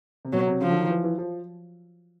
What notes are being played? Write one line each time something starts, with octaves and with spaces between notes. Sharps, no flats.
C3
B2 F#3
C3
C#3 F3
D3
D#3
E3
E3
F3